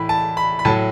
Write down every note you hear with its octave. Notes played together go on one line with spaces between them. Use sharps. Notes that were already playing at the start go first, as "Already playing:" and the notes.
Already playing: A2 E3 B5
A5
B5
B5
A2 F#3 A5